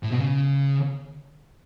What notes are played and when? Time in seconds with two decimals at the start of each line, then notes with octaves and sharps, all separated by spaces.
0.03 A2
0.12 B2
0.20 C#3